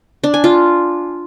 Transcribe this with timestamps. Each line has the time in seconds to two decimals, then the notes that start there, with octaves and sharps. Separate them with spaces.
0.24 D4
0.34 G#5
0.44 F4